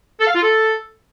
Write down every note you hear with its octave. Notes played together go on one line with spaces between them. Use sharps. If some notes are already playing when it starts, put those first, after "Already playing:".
A4
F5
F4
A4